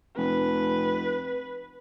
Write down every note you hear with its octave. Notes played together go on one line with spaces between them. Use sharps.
F1 B4